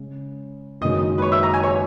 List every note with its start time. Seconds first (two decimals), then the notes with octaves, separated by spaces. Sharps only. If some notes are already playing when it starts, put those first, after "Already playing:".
Already playing: C#3 G#3 C#4
0.81 F#1 F#2 D#3 G#3 D#5
1.18 B4
1.22 C#5
1.32 E5
1.43 A#5
1.54 G#5
1.63 C#5